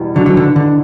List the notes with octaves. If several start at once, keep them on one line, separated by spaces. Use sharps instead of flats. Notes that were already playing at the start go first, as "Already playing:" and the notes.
Already playing: E2 B2 G3
D3 F#3
D3 F#3
D3
D3